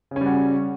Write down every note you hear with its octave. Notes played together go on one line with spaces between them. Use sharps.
C#3 G3 C#4 F#4